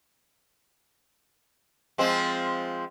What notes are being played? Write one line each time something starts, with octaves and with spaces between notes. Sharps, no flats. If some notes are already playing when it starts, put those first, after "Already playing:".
F3 G#3 C4